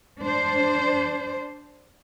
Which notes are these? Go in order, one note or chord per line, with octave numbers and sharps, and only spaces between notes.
D4 C5